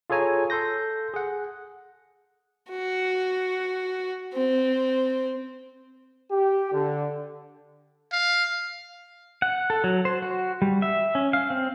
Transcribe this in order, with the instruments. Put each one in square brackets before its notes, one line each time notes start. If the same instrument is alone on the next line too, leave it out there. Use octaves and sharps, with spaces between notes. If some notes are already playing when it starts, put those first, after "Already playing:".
[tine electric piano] F4 G#4 A4 C#5 G#5 A#5
A4 C6 G6 A#6
G#4 F#5
[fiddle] F#4
C4
[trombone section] G4
D3
[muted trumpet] F5
[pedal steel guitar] F#5
A4
F#3
C5
F#4
G3
E5
C#4
F5
C4